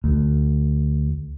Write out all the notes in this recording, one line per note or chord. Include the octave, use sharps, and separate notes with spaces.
D2